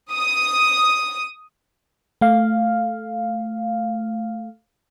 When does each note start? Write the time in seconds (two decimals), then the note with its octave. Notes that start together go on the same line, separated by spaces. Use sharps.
0.13 D#6
2.21 A3 F5